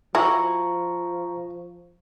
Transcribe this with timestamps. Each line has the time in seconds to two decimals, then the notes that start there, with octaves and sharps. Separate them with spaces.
0.15 F3 E4 F#4 A#5 C#6